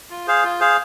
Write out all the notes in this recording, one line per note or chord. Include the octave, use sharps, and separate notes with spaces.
F4
G#4 C5 F5
F4
G#4 C5 F5